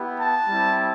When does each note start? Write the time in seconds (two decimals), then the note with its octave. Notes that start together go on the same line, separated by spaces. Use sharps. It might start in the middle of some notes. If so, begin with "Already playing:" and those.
Already playing: B3 E4 G4
0.19 A5
0.48 G3 C4 E4